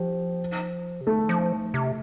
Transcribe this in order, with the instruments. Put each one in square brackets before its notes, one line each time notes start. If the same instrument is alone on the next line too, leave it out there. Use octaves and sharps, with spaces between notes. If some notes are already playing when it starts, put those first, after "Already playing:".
Already playing: [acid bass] F3 [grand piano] G4
[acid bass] C3
[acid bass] D3 [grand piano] A3
[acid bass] F3
C3